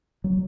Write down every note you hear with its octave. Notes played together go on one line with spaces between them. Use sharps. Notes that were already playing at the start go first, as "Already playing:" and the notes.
F#3